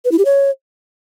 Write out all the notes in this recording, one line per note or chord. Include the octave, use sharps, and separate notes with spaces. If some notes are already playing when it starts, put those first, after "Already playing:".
B4
E4
G4
C#5